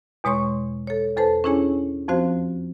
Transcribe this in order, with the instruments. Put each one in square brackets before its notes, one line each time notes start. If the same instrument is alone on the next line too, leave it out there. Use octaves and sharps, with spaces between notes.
[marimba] E2 B2 G#3 C#5 C6 C#6
A4 C#5
E2 A4 B4 C5 A5
C#4 D4 E4 G#4 C#5 G#5
F2 F3 C4 F#4 C5 F5